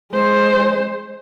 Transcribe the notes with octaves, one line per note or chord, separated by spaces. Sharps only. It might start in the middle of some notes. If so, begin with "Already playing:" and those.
G#3 C5